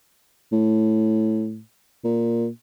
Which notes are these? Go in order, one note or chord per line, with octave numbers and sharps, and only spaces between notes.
A2
A#2